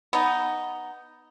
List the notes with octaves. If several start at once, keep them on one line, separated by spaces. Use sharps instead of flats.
B3 D#4